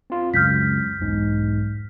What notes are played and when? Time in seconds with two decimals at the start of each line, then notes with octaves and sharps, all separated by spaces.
0.10 C4 F4
0.34 C#2 F#2 F6 G6 B6
0.99 B1 E2 G#2